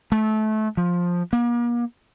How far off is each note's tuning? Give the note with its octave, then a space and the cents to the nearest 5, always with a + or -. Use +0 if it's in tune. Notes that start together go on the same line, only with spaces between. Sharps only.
A3 -25
F3 +10
A#3 +40